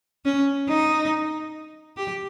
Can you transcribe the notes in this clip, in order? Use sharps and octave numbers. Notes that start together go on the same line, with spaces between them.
C#4
D#4
G4